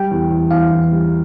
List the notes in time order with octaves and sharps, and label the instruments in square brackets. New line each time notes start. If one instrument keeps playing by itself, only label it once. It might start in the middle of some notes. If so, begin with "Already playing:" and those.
Already playing: [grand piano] G3 [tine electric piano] G5
[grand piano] E2
E2
[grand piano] E2 [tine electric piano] F5
[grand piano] E2
G3